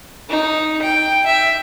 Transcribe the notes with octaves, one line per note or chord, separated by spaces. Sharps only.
D#4
G5
E5